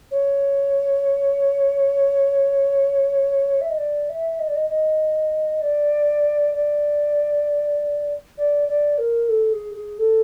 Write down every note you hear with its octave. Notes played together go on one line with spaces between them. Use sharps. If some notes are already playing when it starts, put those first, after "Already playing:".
C#5
E5
D#5
D5
E5
D#5
D5
D#5
D#5
D5
D5
D5
D5
A#4
A4
G#4
G#4
A4